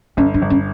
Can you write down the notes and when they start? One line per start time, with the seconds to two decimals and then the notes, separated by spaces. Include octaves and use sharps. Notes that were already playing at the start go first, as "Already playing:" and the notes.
0.17 G1 C#4
0.34 D4
0.42 G1
0.50 C#4